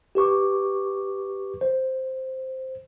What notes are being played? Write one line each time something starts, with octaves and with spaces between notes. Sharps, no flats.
G4 B4 C#6 D6
C5